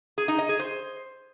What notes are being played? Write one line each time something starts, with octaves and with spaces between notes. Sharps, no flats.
G#4
D#4
D#5
G#4
C5